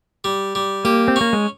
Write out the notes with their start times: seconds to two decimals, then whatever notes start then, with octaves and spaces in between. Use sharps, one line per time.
0.24 G3
0.55 G3
0.85 A#3 G4
1.08 C4
1.16 A#3 C#4
1.33 G#3